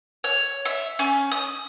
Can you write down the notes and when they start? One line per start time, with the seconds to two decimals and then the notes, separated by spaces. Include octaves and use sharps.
0.24 C#5
0.65 E5
0.99 C#4
1.32 D#6